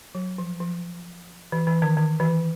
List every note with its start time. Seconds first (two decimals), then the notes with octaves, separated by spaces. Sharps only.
0.15 F#3
0.38 F3
0.60 F3
1.52 E3
1.67 E3
1.82 D#3
1.97 D#3
2.20 E3